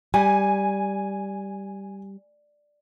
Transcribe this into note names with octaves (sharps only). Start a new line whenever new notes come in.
G3 G#5